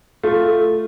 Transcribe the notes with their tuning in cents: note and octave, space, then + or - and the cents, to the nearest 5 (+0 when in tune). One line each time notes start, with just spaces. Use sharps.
A3 +0 F4 +0